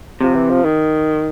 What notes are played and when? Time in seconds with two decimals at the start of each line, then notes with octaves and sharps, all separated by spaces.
0.21 C3 F3
0.35 E3
0.50 F3
0.65 D#3